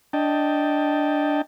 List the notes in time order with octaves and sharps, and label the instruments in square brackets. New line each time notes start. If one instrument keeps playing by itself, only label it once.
[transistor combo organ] D4 D#5 G5 A5